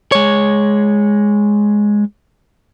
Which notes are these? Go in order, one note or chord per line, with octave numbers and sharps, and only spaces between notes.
G#3 C#5